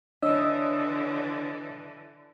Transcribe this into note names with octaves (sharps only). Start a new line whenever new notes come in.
D3 E3 D4 C#5 D#5 D#6 E6